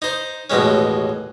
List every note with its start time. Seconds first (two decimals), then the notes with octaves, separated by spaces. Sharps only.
0.02 D#4 C5
0.50 A1 D#2 B2 G#3 C#4